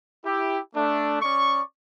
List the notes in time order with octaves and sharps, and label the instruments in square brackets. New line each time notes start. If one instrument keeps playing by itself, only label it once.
[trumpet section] E4 G4
A3 D4
C#4 D5 C#6